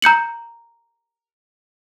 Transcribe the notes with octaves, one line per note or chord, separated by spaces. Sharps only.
A#5 G6 C#7 F#7